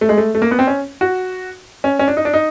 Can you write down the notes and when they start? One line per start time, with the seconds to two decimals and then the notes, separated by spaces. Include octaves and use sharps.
0.01 A3
0.09 G#3
0.18 A3
0.35 A3
0.42 A#3
0.51 B3
0.59 C4
0.67 C#4
1.01 F#4
1.84 C#4
1.99 C#4
2.08 D4
2.17 D#4
2.25 D4
2.33 D#4